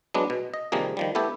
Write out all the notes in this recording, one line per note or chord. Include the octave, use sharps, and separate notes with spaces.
F#3 G#3 B3 D4
B2
D#5
C3 D#3 F3 G3 A#3 G#4
D#3 F3 G3
A3 B3 E4 G4 A4